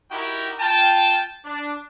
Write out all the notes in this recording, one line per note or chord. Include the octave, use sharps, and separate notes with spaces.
D#4 E4 F#4 G4 A#4 G5
F4 G5 A5
D4